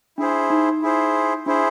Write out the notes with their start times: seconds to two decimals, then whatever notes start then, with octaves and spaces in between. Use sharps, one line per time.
0.18 D4 E4 G#4 C5
0.50 D#4
0.82 E4 G#4 C5
1.46 D4 E4 G#4 C5